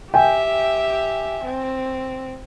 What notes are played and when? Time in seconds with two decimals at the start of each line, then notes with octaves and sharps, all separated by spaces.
0.14 G4 E5 G5 G#5
1.44 C4